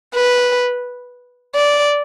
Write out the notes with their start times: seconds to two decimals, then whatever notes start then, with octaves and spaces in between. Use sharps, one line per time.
0.15 B4
1.55 D5